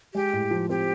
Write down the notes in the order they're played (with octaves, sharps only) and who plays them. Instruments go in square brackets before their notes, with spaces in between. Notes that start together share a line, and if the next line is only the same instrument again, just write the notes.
[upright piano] G#3 [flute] G4
[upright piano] A2
F3
[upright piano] C4 [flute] G4